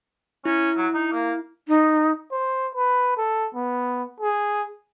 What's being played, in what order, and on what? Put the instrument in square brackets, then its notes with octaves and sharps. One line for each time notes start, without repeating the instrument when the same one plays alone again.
[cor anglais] C#4 [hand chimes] E4
[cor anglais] F#3
D#4
A#3
[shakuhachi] D#4
[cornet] C5
B4
A4
B3
G#4